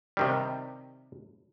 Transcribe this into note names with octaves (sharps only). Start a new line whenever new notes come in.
C3 D#3 G3